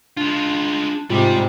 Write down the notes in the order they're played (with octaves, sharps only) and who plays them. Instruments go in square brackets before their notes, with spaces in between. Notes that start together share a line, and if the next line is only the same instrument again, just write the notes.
[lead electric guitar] G#3 F4 [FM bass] D4
[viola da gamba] G#2 C3 [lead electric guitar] G3 [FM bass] F4